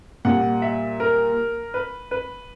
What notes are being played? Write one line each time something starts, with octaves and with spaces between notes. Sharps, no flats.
A#2 G3 F#5
E5
A#4
B4
B4